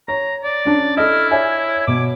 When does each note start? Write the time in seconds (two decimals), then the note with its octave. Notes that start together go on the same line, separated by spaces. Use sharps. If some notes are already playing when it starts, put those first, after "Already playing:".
0.08 C#5 A#5
0.44 D5
0.65 C#4 D4
0.97 E4 A4 D#5 F6
1.31 C#5 D5 E5 G#5
1.87 B2 D6